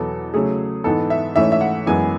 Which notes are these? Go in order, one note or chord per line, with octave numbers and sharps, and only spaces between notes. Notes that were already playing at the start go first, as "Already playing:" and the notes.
Already playing: E2 B2 F#3 B3 A4
C#3 F#3 A3 G#4
G#2 E3 B3 A4
E5
G#2 E3 A3 C#4 E5
E5
F#5
F#2 E3 G#3 B3 G#5